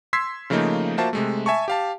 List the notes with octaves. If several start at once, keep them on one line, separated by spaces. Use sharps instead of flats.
C6 E6 G#6 B6 C7
C#3 F3 A3 A#3 D#4
A#3 F4 F#4 C5 E5 A5
C3 G#3 A3
E5 G#5 A5 C#6
G4 F5 A5